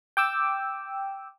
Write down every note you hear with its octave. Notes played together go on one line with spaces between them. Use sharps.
G5 D6 E6